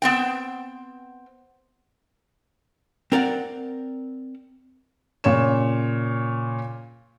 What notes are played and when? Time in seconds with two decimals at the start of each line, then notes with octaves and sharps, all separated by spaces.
0.02 B3 C4 G5
3.12 C4 A#4 D5 F#5
5.24 A#2 C#3 C#5 E7